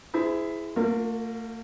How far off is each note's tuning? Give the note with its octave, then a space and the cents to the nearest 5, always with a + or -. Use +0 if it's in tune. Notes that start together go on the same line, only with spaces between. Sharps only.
E4 +0 G#4 +5 C5 -35
A3 +45 F4 +35 A#4 +0